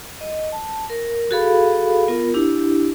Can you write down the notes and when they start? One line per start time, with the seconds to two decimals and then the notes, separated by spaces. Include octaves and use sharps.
0.21 D#5
0.52 A5
0.90 A#4
1.31 F#4 G#4 A4 F5 B5
2.08 B3 F4 A#4
2.34 D4 E4 G4